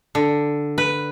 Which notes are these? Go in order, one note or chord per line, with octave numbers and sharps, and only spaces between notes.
D3
B4